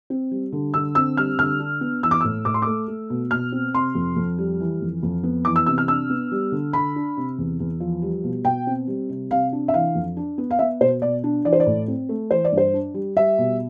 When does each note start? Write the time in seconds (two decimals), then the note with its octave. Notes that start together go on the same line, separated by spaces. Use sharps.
0.10 C4
0.31 G3
0.52 D3
0.74 D3 E6
0.95 C4 E6
1.17 G3 F6
1.39 D3 F6
1.60 D4
1.81 B3
2.03 E3 E6
2.11 D6
2.21 E6
2.24 A2
2.45 A2 D6
2.54 C6
2.62 A3 D6
2.88 A3
3.10 B2
3.31 B2 F6
3.52 C4
3.74 C3 C6
3.95 F2
4.16 F2
4.38 G3
4.60 E3
4.81 F2
5.03 F2
5.23 B3
5.45 E3 D6
5.56 E6
5.66 C3 E6
5.78 F6
5.88 D4 E6
6.10 B3
6.32 G3
6.52 D3
6.73 D3 B5
6.96 D4
7.17 C3
7.38 E2
7.60 E2
7.80 F3
8.02 G3
8.24 B2
8.45 B2 G5
8.67 C4
8.87 G3
9.09 C3
9.31 C3 F5
9.52 D4
9.68 E5
9.74 E3 F5
9.95 F2
10.17 D4
10.38 B3
10.51 F5
10.59 B3 E5
10.81 B2 C5
11.02 B2 D5
11.24 D4
11.45 E3 D5
11.53 C5
11.60 D5
11.66 A2
11.88 C4
12.09 A3
12.31 E3 C5
12.45 D5
12.52 G2
12.58 C5
12.73 D4
12.94 G3
13.16 G3 E5
13.38 B2